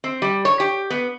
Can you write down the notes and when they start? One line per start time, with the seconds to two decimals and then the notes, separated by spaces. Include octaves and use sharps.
0.04 C4
0.22 G3
0.45 C#5
0.60 G4
0.90 B3